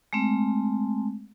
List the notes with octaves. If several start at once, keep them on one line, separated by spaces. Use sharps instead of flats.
G#3 A3 C4